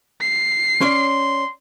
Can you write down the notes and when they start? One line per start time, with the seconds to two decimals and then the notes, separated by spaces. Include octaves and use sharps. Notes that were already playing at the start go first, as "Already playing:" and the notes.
0.21 C7
0.81 C#4 C#5 D5 C6